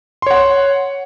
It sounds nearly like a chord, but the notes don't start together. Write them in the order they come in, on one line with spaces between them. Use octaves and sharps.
C6 C#5 F#5